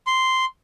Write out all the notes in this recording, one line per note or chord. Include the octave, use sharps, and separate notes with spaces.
C6